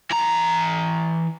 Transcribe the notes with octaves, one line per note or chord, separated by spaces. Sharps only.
E3 A#5